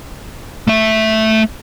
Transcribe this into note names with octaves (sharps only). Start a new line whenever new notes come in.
A3 E5